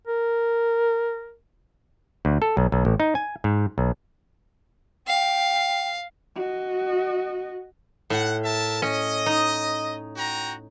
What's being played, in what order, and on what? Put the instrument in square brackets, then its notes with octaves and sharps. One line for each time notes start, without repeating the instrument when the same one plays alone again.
[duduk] A#4
[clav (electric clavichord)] D2
A4
B1
B1
A1
D#4
G#5
G#2
B1
[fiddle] F5 [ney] G5
[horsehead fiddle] F#4 D#5
[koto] A2 [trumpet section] F#5
[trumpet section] A#4 E5 A5
[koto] C#4 [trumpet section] D#5
[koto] D#4
[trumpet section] F#4 G5 A#5